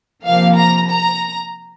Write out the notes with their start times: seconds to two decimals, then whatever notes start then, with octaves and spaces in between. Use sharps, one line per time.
0.24 C3 F3 A#3 F5
0.56 A#5
0.88 A#5